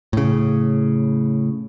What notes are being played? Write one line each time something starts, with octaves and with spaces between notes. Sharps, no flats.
A2 C#3